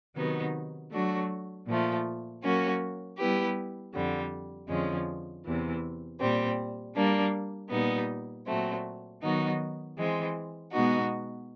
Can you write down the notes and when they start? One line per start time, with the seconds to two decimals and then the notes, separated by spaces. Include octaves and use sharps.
0.16 C3 D#3 F#3 B3 D#4
0.91 F#3 A3 D4 F#4
1.66 A#2 F3 A3
2.42 F#3 A#3 C#4 F#4
3.18 G3 B3 E4 G4 B4
3.93 F2 D3 G3
4.68 F2 D3 F3 G#3 C#4
5.45 E2 C3 E3
6.20 A#2 G3 C4
6.95 G3 A#3 D4
7.71 A#2 G3 B3 D#4
8.46 A#2 F#3 A3 C4
9.22 D#3 F#3 B3 D#4 F#4
9.97 E3 G#3 C4
10.72 B2 G#3 B3 D#4 F#4